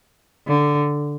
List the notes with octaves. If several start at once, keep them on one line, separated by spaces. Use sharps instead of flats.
D3